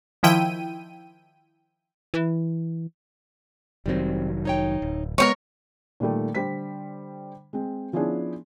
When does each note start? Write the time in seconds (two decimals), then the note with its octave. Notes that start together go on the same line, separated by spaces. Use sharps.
0.23 D#3 F3 E4 G5 D#7
2.14 E3
3.86 F1 D#3 F#3 G3 C4
4.45 D#4 C#5 G5
4.82 D1
5.18 G#3 B3 A#4 C5 C#5
6.00 A#2 D#3 G3 A3
6.35 D3 G3 C5 B6
7.53 G#3 C4
7.93 F3 B3 C#4 D4 E4 G#4